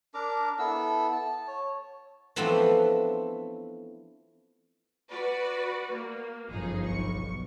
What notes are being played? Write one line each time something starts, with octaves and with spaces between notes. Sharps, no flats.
D4 A#4 A#5 D6
B3 E4 A4 E6
A5
C#5
E3 F3 A3 B3 C4 D4
F#4 B4 D5
A#3
G1 F#2 F3 D#4 G#4
B1 C#6